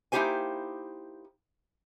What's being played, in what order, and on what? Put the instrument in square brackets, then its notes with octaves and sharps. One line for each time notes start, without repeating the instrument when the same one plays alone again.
[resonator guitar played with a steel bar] A#3 D#4 E4 G4 C5 G#5